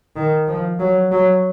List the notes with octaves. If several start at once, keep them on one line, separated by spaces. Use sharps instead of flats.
D#3
F3
F#3
F#3